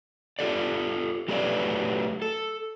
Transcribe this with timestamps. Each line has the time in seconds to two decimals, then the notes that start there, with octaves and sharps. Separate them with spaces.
0.39 F4 G4 A4 D5
1.28 F#3 A3 G4 A4 B4 D5
2.22 A4